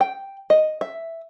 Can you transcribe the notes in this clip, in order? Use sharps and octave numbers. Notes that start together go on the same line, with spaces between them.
G5
D#5
E5